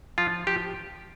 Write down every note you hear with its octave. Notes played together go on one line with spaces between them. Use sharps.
F3 F4
F3 G4